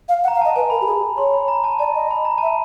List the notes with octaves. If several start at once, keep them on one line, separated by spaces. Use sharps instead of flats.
F5
F#5
A#5
F5
D#5 A5
B4 G#5
A#4 B5
G4
G#4
C#5 C6
B5
A#5
A5
D5 A5
D#5
B5
A#5
E5 A5